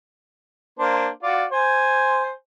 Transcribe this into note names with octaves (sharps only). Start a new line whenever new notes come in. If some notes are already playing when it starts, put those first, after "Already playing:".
A#3 D4 C5
F4 F#4 D5
C5 G#5